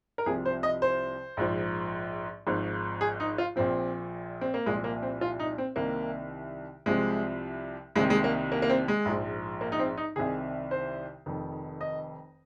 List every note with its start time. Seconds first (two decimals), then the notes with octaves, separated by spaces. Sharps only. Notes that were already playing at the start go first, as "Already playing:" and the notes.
0.18 A#4
0.26 C2 C3 F3 G#4
0.46 C5
0.63 D#5
0.82 C5
1.37 A#1 G#2 F3
2.47 G#1 G#2 F3
3.01 G#4
3.20 D#4
3.38 F4
3.56 A#1 A#2 F3 C4
4.41 C4
4.54 A#3
4.66 C2 A#2 F3 G#3
4.84 A#3
5.03 C4
5.21 F4
5.39 D#4
5.58 C4
5.76 C2 C3 D#3 A#3
6.86 C2 C3 F3 G#3
7.95 C2 C3 D#3 G#3
8.10 G#3
8.24 A#3
8.52 A#3
8.62 A#3
8.70 C4
8.88 G#3
9.05 A#1 G#2 F3
9.61 A#3
9.72 D#4
9.79 C4
9.97 D#4
10.16 C2 C3 D#3 G#4
10.71 C5
11.26 F1 F2 D#3
11.81 D#5